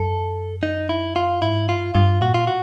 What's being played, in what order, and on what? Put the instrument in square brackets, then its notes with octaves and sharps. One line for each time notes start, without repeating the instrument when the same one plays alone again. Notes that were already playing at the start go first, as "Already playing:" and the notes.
Already playing: [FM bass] F#2 [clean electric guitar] A4
[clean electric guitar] D#4
E4
F4
[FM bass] G#2 [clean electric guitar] E4
[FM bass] G2 [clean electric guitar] F4
[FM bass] G2 [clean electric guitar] F4
[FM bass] A#2 [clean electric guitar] F#4
[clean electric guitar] F4
F#4